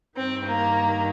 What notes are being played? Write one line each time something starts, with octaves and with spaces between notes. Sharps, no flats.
G2 D#3 C4
A#3